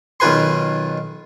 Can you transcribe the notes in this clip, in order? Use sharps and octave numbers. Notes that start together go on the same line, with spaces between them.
B1 D#3 F4 B4 G#5 C6